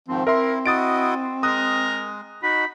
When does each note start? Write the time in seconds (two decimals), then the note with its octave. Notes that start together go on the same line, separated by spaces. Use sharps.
0.08 G#2 D#3 F3 C4
0.27 E4 A#4 E5 C6
0.66 E4 F#4 D#5 D#6 A6 D7
1.43 G#3 A#4 D#6 F#6
2.43 D#4 F#4 B5